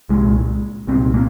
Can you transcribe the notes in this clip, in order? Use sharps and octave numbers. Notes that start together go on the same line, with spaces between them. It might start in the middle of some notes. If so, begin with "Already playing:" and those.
C2 A#2 G#3
C2 A#2 C4
A#3